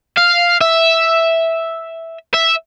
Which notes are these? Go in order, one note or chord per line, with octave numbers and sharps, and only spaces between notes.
F5
E5
E5